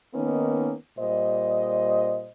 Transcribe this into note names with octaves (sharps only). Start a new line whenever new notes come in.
D#3 A#3 B3 C#4 D#4
A#2 G3 C5 D#5